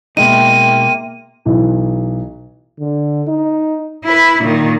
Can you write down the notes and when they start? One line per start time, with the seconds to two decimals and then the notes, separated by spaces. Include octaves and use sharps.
0.17 B2 G#3 A#3 D#4 E5 G5 C6 D#7
1.45 B1 E3
2.80 D3
3.28 D#4
4.04 E4 B4
4.42 A#2 D#3